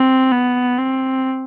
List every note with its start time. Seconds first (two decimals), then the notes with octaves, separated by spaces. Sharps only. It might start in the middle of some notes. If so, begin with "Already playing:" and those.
Already playing: C4
0.31 B3
0.78 C4